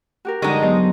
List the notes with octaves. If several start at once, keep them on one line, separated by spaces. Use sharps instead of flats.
F#4 G4 A#4
G2 D3 F3 G#3 D#4 F#5 A#5 C#6
F#3 B3 C5 D#5 A#5